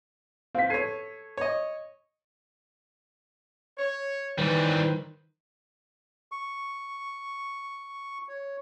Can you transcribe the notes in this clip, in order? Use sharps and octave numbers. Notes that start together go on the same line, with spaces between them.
C4 F5 B6
A4 C#5 G#6 C7 D#7
C#5 D#5
C#5
D#3 E3 G3 B4 C5
C#6
C#5